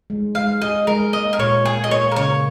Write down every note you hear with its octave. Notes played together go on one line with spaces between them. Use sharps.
G#3
G#3 F5
G#4 D#5
G#3 A#4
A#3 D#5
A#4
A#2 C#5
A#3 G#4
D#5
A#3 C#5
A#4
C#3 C#5